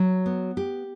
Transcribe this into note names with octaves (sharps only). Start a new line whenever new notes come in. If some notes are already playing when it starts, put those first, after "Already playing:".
Already playing: F#3
B3
G4